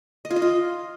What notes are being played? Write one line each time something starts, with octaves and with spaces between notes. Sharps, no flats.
D#5
F4
D#5
F4